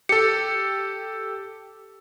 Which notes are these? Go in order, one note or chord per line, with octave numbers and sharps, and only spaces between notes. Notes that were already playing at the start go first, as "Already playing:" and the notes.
G4 A4 C#7